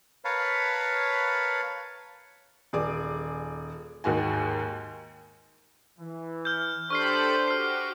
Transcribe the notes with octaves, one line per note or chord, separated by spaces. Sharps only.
A#4 B4 C#5 F5 A5 B5
D#1 G#4 D5 D6
D#2 G#2 F#4 G#5
E3
F6 G6
D4 G4 A4 C5 B5 C#6 F6 C7
F#4 G4 F6 C7